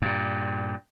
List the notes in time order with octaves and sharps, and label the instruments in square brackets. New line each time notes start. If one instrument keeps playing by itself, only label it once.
[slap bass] G2 A#2